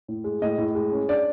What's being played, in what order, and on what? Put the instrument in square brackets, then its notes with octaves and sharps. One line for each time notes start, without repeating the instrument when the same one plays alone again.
[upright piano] A2
G#3
A2 D#5
A2
G#3
C#4
D4 D5